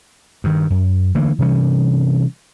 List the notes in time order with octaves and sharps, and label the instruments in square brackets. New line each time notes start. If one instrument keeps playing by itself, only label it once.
[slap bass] G2 D#3
F#2
D3 E3 A3 A#3
C3 E3 G3 C#4